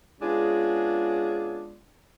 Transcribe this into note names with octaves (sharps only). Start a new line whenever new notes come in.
G#3 B3 C#4 D4 F4 G#4